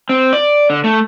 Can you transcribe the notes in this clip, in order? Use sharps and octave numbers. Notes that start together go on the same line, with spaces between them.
C4
D5
D3
A3